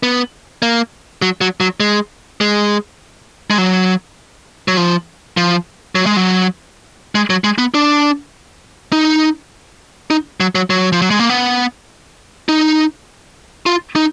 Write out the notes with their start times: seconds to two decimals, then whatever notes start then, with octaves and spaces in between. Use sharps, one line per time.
0.03 B3
0.62 A#3
1.22 F#3
1.41 F#3
1.60 F#3
1.80 G#3
2.41 G#3
3.50 G#3
3.58 F#3
4.68 F#3
4.77 F3
5.37 F3
5.95 F#3
6.06 G#3
6.17 F#3
7.15 G#3
7.30 F#3
7.44 G#3
7.58 B3
7.74 D4
8.92 D#4
10.10 D#4
10.40 F#3
10.55 F#3
10.70 F#3
10.92 F3
11.02 F#3
11.10 G#3
11.20 A#3
11.30 B3
12.49 D#4
13.66 F4
13.96 D#4